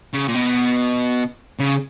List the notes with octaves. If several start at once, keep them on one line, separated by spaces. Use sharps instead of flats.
C#3
A#2
B2
C#3